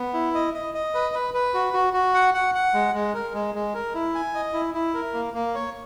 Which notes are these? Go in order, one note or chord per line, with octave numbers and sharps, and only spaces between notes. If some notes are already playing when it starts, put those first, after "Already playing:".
Already playing: B3
E4
D#5
D#5
D#5
B4
B4
B4
F#4
F#4
F#4
F#5
F#5
F#5
G#3
G#3
A#4
G#3
G#3
A#4
E4
G#5
D#5
E4
E4
A#4
A#3
A#3
C#5